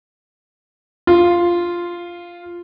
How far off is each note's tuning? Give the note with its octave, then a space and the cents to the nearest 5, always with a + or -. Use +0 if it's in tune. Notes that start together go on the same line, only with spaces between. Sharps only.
F4 -5